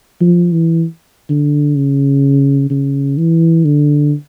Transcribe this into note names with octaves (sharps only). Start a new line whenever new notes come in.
F3
E3
D3
C#3
C#3
E3
D3